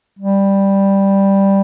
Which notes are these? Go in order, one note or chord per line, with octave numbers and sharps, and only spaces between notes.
G3